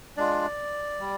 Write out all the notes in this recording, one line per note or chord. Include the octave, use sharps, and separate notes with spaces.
G#3 D4 F4 D5
G3